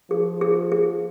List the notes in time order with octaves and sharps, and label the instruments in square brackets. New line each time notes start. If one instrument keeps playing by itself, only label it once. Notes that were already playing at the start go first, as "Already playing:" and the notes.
[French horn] F3 [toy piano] G#4
[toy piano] G#4
G#4